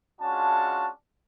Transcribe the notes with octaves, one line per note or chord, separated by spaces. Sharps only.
G#3 C#4 D4 F4 F#4 A5